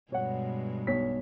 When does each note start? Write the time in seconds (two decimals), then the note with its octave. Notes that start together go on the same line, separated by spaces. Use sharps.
0.12 G2 B2 G#3 C#5 F#5
0.87 B1 C#5 B6